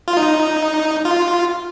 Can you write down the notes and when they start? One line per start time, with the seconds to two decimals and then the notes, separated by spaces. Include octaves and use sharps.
0.08 F4
0.17 D#4
1.05 F4